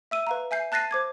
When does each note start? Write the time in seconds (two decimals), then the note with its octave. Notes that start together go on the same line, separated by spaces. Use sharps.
0.11 E5 E6 D#7
0.27 B4 F5 A#5
0.51 E5 G#5 G6 C7
0.72 A5 F#6 A6 A#6 C7 D#7
0.91 C5 D6 G#6